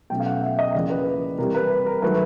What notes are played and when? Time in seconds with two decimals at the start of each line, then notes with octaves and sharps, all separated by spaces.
0.10 B2 F#3 A3 C#4 G5
0.20 F5
0.26 F#5
0.42 E5
0.59 D#5
0.74 E2 C#3 F3 A#3 D5
0.90 B4
1.38 C3 E3 G3 A#4
1.55 B4
1.86 A#4
2.02 D#3 F#3 A3 B4